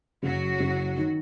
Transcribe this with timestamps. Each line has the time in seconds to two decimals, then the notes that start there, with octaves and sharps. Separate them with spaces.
0.23 F#1 F#3 F#4
0.60 F#1
0.97 D#3